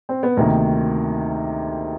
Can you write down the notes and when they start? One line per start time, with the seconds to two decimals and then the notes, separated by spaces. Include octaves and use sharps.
0.09 C4
0.23 B3
0.37 D2 C3 D#3 A#3